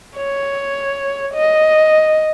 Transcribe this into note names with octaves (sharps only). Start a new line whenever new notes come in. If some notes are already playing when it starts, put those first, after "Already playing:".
C#5
D#5